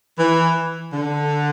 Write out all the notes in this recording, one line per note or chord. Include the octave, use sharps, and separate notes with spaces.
E3
D3